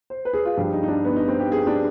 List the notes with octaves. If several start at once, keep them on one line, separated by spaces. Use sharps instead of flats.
C5
B4
G#4
F4
G2 F3 G4
D#4
D#4
D4
B3
D#4
C4
G4
G#4
D4